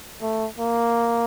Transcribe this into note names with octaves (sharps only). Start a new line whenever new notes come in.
A3
A#3